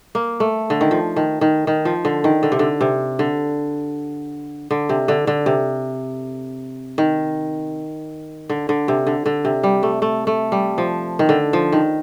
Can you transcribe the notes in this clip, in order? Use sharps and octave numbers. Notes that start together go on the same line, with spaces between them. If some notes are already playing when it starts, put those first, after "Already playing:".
A#3
A3
D3
D#3
F3
D#3
D#3
D#3
F3
D3
D#3
D3
C3
D3
C3
D3
D3
C3
D3
D3
C3
D#3
D3
D3
C3
D3
D3
C3
G3
A3
A3
A3
G3
F3
D#3
D3
F3
D#3